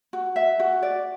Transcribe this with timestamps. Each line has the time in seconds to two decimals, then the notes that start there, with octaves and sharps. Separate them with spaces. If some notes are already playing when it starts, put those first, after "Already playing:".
0.13 F#4
0.36 E5
0.60 F#4
0.82 D5